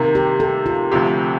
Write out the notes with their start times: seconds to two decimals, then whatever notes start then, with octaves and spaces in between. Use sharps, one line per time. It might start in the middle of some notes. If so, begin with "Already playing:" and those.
Already playing: C3 D#3 A#3
0.15 G4
0.40 A4
0.66 F4
0.92 D2 C3 F3 C4 G4